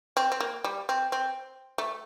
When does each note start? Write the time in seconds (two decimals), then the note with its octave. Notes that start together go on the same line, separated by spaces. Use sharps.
0.17 C4
0.32 C4
0.40 A#3
0.64 G3
0.89 C4
1.12 C4
1.78 A3